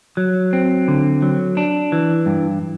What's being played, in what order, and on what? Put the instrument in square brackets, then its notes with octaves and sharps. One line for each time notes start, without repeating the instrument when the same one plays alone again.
[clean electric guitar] F#3
C4
D3
F#3
D4
E3
G2